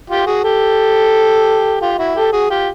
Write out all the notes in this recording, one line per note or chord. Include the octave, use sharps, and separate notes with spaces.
F4 G4
F#4 G#4
G4 A4
F4 G4
E4 F#4
G4 A4
F#4 G#4
F4 G4